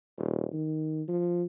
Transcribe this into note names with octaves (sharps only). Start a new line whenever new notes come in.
D#1
D#3
F3